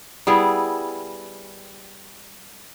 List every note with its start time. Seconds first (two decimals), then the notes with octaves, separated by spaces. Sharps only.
0.27 G3 B3 E4 G#4